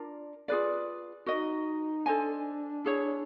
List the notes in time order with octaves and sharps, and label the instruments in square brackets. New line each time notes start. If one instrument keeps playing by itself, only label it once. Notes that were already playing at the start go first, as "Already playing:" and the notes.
Already playing: [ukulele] D4 F4 A#4 D5
F4 G#4 B4 D5
[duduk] D#4 [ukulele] F#4 A#4 D#5
[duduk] D4 [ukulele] A4 C5 D#5 G#5
[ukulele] E4 G#4 C#5